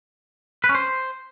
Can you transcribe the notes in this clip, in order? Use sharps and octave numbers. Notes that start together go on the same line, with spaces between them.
B4
C#4
C5